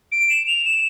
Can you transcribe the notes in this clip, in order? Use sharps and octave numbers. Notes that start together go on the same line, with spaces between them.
D7
E7
F7
E7